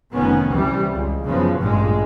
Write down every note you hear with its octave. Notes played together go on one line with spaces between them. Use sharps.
F1 D#3 B3 C#4
C2 E3 G3
C#2
F#1 C#3 F3 B3
A1 G2 A#2 G#3